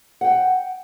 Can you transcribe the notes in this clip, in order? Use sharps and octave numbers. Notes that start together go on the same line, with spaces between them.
F#5 G5